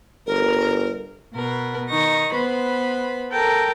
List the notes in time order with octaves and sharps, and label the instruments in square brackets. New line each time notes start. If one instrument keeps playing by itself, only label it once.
[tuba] G1 [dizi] A#4
[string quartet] B2 A#4 B4
D#3 D#4 C#6 A#6
B3 B4 C5 B5
A4 A#4 G5 A5 A#5